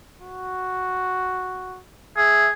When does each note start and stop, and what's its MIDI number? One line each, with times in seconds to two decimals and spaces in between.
0.22 1.80 66
2.17 2.52 68
2.17 2.48 76